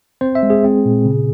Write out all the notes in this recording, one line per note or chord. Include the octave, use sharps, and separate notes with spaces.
C4 C5
E5
G#3
G#4
C4
A#2
C#3